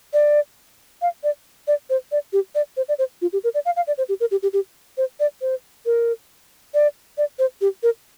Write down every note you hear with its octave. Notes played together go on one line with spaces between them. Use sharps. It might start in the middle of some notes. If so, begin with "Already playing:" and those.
D5
F5
D5
D5
C5
D5
G4
D5
C5
D5
C5
F4
G4
A#4
D5
F5
F5
D5
C5
G4
A#4
G4
G4
G4
C5
D5
C5
A#4
D5
D5
C5
G4
A#4